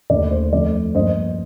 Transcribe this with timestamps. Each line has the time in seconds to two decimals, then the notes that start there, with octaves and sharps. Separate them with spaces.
0.10 D#2 D3 A3 D5
0.31 C5
0.52 F2 D3 F3 A3 D5
0.95 G2 F3 A#3 C5 D#5